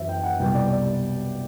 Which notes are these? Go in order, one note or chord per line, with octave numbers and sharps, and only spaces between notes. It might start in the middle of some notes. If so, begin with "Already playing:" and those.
Already playing: F#2 E3 C5 E5
G5
F#5
C2 B2 G3 G5
D5
D5